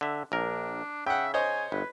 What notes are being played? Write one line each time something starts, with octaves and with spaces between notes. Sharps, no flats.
D3 E5
A#1 D4 A#4
C#3 E5 F#5 G5
C5 C#5 D#5 G#5
G1 B4